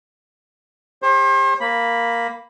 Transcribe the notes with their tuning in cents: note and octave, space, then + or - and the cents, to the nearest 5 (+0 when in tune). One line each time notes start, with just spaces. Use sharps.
G4 +35 C5 +40
A#3 +0 B5 +0